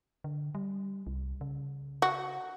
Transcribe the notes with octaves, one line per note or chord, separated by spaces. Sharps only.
D3
G3
C2
C#3
F#4